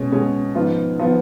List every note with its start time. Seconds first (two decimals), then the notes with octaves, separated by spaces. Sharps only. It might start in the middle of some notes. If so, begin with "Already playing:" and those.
Already playing: B2 G#3 C#4
0.12 B2 G#3 C#4
0.55 G#2 F3 B3 F4
0.99 F3 B3 F4